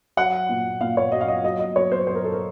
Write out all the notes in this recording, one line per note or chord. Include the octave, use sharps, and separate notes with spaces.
F#3 F#5
A#2
A#2 F5
C#5
F#3 D#5
F5
D#5
F#3 D#5
D#5
F#3 C#5
C5
F#3 C5
A#4
A4
A#4